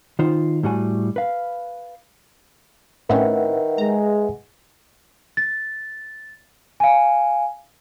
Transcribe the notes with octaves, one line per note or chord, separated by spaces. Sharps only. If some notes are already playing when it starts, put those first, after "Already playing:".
D#3 D#4 F4 C5
A2 G3 F#4 G#5
B4 F5
A2 D#3 C4 C#4 B4 E5 F#5
G#3 A#5
A6
F5 G#5